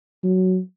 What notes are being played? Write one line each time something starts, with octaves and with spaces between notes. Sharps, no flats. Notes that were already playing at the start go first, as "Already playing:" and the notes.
F#3